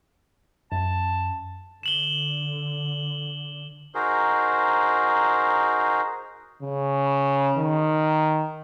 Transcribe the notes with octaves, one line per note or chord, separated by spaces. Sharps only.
F#2 A5
D3 E7 F#7 G7
D#4 F#4 G#4 A#4 C5
C#3
D#3